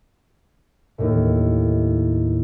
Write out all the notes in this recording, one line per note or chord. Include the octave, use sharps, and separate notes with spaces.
D#2 A2